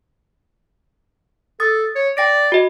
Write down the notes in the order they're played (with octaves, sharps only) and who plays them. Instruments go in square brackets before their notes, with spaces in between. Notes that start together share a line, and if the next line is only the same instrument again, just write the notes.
[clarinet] A4 [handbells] D#6 A6
[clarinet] C#5
[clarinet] D5 [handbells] G5 A#6 D7
[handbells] F#4 D#5